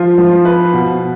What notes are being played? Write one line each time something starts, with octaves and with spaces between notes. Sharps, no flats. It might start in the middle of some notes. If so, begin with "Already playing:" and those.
Already playing: F3 F4
F3
B4
B2